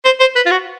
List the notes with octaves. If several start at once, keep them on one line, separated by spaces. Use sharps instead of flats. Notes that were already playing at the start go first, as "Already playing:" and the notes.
C5
C5
B4
F4
F#4